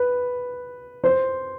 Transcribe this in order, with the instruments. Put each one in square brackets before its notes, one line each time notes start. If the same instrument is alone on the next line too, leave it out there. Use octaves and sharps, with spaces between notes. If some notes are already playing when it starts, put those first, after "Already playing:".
Already playing: [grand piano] B4
C5